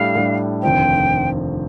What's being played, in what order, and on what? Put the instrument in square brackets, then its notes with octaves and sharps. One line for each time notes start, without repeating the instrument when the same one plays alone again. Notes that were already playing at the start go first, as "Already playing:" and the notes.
Already playing: [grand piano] A2 G3 D4 A4 [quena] F5
[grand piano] A2 G3 D4 A4
[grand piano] F1 D#2 D3 F3 C4 [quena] G5